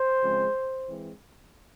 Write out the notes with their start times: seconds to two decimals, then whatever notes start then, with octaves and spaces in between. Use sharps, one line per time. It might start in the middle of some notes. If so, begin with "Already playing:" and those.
Already playing: C5
0.21 C#3 F3 G#3 C4
0.88 E3 G#3 C4